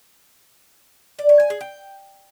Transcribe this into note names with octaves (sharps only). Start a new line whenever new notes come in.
D5
C#5
G#5
G#4
G5